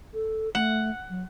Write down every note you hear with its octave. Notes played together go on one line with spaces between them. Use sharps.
A4
A3 F#5
F#3